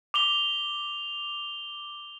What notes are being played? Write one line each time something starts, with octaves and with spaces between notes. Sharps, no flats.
D6 F7 G7